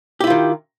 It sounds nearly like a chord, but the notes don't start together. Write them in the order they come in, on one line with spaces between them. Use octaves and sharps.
G4 E4 F4 D#3